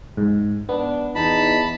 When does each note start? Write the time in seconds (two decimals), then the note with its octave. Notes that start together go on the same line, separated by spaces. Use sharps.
0.17 G#2
0.69 B3 D4
1.15 E2 D#4 A5 B5